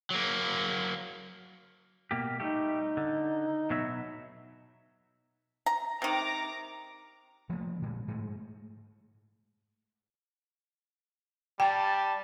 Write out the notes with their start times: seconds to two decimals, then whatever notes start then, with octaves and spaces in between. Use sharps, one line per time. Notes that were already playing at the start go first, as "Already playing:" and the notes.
0.11 F#3 A#3
2.11 B2 A#3 G4
2.40 G3 A3 D#4 G4
2.97 D3
3.70 B2 F#3 E5
5.66 A#5
6.02 C3 D#3 A#5 D6
7.49 F3 A3 A#3
7.82 A#2 D3 G#3
8.08 G#2 G#3 A3
11.60 G3 G5 A5